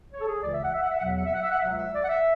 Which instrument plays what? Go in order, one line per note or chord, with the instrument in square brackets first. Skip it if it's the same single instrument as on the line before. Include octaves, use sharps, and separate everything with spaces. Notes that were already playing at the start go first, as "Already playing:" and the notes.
[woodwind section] C#5
A4
G#4
C#2 C#3 E3 D5
E5
F#5
E5
F#5
E5
F#5
E2 B2 F#3 E5
F#5
E5
F#5
E5
F#5
E5
C#2 B2 F#3 F#5
E5
D5
F#5
E5